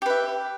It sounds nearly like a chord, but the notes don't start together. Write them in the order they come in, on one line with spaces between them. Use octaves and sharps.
G4 B4 E5